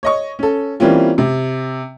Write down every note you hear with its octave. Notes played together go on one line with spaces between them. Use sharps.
C#5 D#5 C#6
C#4 A4
E3 G3 A#3 C4 C#4 F4
C3